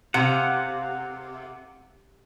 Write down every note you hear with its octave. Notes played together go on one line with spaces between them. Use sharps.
C3 F5 F#5